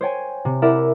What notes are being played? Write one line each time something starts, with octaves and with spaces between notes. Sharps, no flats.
C5 C#5 G5 G#5
C3
E4 A#4 D5 E5 F#5